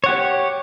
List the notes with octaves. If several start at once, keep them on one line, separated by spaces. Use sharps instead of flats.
G4 C#5 F#5